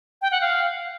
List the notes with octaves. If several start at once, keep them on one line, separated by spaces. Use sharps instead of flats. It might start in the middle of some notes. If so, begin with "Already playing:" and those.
G5
F#5
F5